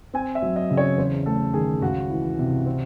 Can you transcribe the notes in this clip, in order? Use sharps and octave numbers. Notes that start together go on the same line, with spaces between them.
C4 G#5
E5
F#3
D#5
C#3
C#5
E2 C5
A3 A4
D#3 G#4
C#2 F#4
E3
C3
C4